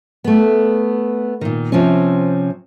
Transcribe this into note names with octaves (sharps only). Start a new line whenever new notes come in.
A3 B3
A#2 D#3
C3 F3 C4 C#4